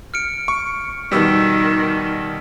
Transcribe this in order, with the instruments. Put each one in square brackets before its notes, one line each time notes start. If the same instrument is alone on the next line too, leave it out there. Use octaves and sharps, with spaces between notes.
[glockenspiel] F6 C#7 D7
[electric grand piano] C#6
[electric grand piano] B2 G3 E6 [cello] D#3 [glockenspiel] B6